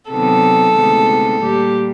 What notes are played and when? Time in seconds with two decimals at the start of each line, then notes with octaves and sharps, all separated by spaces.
0.11 C3 D#3 F#3 B3 A4
0.76 D2 C3 D#3 G#3 B3
1.41 A#2 G3 A#3 G4